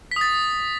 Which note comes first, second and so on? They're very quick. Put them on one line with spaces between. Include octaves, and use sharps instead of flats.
B6 D#6 A6